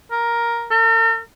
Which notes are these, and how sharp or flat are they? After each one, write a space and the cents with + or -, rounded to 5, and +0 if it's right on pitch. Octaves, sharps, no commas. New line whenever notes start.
A#4 +10
A#4 -45